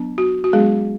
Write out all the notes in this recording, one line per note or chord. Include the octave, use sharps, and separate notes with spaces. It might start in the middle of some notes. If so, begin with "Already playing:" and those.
Already playing: F#3 B3 D4
F#4
F#4
F#3 G#3 B3 D4 G#4